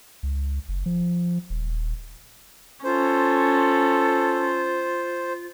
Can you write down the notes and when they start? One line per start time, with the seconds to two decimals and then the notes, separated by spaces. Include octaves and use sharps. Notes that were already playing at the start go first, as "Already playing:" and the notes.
0.23 C#2
0.69 F#1
0.86 F3
1.50 D#1
1.68 D#1
2.84 C#4 F4 A4 C5